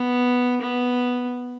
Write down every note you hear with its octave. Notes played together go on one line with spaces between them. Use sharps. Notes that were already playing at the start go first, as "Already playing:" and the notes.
Already playing: B3
B3